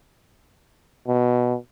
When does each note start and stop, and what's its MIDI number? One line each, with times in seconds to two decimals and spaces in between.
1.08 1.56 47